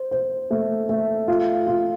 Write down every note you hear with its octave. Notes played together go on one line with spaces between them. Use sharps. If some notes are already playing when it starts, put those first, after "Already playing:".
Already playing: C5
C5
A3
A3
F4
F4